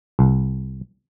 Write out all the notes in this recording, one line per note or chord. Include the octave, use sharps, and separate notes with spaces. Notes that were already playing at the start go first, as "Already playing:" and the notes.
C2